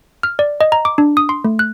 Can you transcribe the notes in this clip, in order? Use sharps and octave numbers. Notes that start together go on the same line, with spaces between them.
F6
D5
D#5
A#5
D6
D4
D#6
C6
A3
F#6